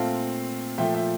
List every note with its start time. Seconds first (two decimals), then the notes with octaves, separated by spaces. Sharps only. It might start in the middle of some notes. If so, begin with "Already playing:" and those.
Already playing: A#2 A3 C4 F5 A5
0.78 A#2 F3 A3 E5 G5
0.94 E5 G5